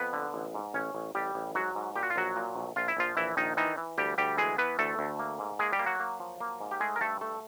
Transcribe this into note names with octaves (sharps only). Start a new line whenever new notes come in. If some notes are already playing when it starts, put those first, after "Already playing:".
Already playing: F2 B3 B4
D3
A1
G#2
A1 C#4 C#5
A1
A1 G3 G4
A1
G#2 F#3 F#4
G#2
A#2 G4
F#4
F4
A#1 F#3 F#4
A#2
A#1
A#1 F4
E4
A#1 F3 F4
A#1 E3 E4
A#1 D#3 D#4
D#3 E3 D#4
E3
D2 G3 G4
D2 G3 G4
E3 G#3 G#4
E3 B3 B4
D2 A3 A4
D2
A#3
G#2
G#3 A#3 G#4
G3 G4
A#3
F#3 F#4
A#3
F3
A#3
G#2
G4
G#3 A3 G#4
A#4
G2 A3 A4
A3 A4